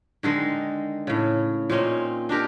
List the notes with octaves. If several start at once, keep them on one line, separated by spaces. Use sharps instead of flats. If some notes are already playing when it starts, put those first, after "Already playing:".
D3 D#3 G#3 D#4
A2 C#3
A#2 C4 C#4 D#4
D4 D#4 G4 A#4